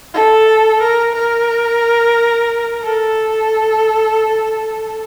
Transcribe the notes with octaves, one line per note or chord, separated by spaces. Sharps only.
A4
A#4
A#4
A4